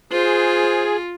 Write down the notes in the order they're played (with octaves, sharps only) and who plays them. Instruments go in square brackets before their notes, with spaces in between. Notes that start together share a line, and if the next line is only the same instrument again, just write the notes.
[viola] F4 [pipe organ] G#4 [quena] C5